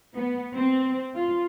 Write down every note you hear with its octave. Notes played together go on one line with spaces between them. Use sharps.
B3
C4
F4